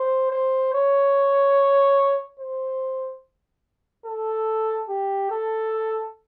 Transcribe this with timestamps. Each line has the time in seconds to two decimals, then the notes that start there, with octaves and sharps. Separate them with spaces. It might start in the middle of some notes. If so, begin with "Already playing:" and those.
Already playing: C5
0.31 C5
0.73 C#5
2.40 C5
4.06 A4
4.89 G4
5.31 A4